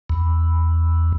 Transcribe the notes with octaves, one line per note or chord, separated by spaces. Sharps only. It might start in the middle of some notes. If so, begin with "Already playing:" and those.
E2